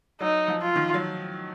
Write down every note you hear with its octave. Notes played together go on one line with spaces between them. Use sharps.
F#3 D#4
F3
F4
D#3
F#3